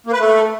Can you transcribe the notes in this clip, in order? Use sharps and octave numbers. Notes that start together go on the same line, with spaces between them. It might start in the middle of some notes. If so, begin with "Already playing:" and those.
A#3
B4
A3